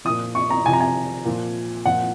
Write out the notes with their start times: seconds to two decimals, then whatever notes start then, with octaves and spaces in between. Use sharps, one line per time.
0.05 A#2 F3 D#6
0.35 C#6
0.50 A#5
0.65 C3 F3 G#5
0.73 A#5
0.80 G#5
1.25 A#2 F3
1.85 A#2 F3 F#5